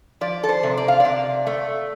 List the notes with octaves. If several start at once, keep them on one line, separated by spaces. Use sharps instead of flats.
F3 D5
A4
C5
C3
D5
F5
C3 D5
A3